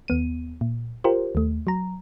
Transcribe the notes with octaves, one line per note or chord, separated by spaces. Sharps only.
D#2 B3 D#7
A#2
F4 G4 A#4 C5
D#2 A3
F#3 A#5